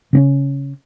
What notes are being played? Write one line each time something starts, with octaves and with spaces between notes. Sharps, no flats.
C#3 C4 C#4